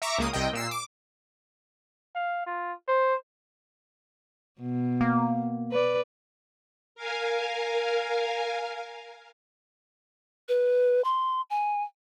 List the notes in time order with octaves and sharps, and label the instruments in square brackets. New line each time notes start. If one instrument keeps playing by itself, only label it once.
[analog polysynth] E5 A#5 C#6 D6
C#2 A#3 D#6
C2 C3 D#5 G5
A#2 E6 C7
D6
[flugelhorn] F5
F4
C5
[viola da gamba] B2
[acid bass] A#3
[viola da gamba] B4 D5
[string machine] A#4 F5 G#5
[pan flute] B4
C6
G#5